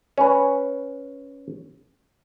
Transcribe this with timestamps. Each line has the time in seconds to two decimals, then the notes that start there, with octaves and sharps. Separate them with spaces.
0.18 C#4 B4